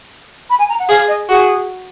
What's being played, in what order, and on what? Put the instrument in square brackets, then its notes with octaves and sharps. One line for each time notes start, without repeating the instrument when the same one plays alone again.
[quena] B5
G#5
A#5
F#5
[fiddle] G#4 [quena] F5
[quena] D#5
[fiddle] F#4 [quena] G#4